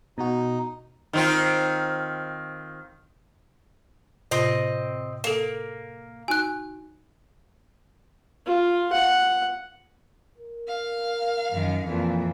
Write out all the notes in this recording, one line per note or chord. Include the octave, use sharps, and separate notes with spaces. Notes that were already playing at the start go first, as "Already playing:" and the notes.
B2 D#4 F#4
D#3 C4 F4
A2 C3 C4 F4 D#5
A#3 A4 E7
D#4 F#4 G#5 F#6
F4
F#5
A#4
F5
F#2 D#3
F2 A#2 E3